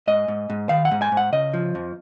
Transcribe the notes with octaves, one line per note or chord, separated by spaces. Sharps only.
G#2 D#5
G#2
G#2
D#3 F5
F#5
G#2
G#5
G#2
F#5
C#3 D#5
F3
F2